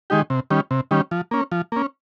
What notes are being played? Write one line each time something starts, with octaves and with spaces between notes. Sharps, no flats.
D#3 G#3 D#4 G4
C3
D#3 G3 C#4
C3
D#3 G3 C#4
F3
A#3 C#4
F3
A#3 C#4